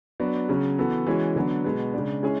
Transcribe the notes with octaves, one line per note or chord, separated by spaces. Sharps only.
F#3 B3 D4 F#4
C#3 F#3 C#4
E3 B3 F#4 A4
E3 G#3 C#4 F#4
D3 F#3 B3 D4
B2 G#3 B3
C#3 G#3 D4
G#3 C#4 E4 G#4